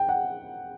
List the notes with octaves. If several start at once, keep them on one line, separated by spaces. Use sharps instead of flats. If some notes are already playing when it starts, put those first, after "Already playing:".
Already playing: G5
F#5